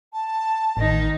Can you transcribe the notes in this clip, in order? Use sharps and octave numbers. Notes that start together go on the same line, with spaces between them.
A5
A1 D#3 D#4